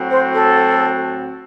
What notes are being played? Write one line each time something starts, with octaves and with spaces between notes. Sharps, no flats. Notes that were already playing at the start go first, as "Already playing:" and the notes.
Already playing: A2 F#3 C4 F#4
C5
A4